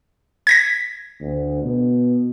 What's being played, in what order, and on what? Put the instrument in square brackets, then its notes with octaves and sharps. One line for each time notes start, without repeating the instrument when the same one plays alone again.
[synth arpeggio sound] G#6 A#6 B6
[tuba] D2
B2